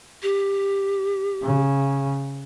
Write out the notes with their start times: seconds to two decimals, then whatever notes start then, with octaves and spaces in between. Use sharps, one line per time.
0.23 G4
1.43 C#3